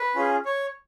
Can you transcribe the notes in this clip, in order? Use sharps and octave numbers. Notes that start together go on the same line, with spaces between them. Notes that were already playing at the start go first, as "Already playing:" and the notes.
Already playing: B4
C#4 F4 G#4
C#5